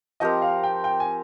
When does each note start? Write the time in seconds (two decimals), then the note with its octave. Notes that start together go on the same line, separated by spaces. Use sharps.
0.20 F3 C4 G4 A#4 D#5
0.42 F5
0.63 G5
0.84 G5
1.00 G#5